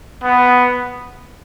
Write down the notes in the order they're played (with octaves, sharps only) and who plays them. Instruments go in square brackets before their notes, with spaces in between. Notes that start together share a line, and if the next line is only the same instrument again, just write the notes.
[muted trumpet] B3